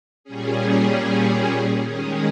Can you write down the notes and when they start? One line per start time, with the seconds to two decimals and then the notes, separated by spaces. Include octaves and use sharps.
0.24 A#2 G3 C#4 G#4
1.84 D#3 G#3 C#4 G#4